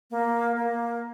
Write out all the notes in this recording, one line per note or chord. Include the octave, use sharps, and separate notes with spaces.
A#3
A#3